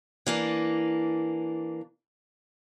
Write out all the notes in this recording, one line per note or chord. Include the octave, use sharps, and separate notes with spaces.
E3 A#3 D4